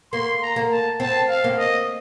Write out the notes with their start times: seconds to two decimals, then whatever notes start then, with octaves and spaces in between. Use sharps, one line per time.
0.13 A#3 C6
0.42 A#5
0.56 A#3
0.72 A5
1.00 C4 A5
1.29 F5
1.44 A#3
1.59 D#5